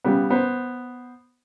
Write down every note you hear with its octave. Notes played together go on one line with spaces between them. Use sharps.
C#3 G3 B3
B3 C5